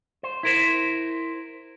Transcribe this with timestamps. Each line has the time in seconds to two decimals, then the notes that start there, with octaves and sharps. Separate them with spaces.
0.23 C5
0.43 E4 A#4 C5